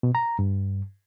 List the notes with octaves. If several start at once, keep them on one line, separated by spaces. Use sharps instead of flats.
B2
A#5
G2